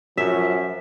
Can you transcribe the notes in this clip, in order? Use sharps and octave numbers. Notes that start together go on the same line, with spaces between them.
F#2 F3 E5